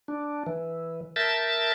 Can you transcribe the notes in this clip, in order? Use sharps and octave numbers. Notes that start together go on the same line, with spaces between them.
D4
E3
A#4 E5 A5 G6 A6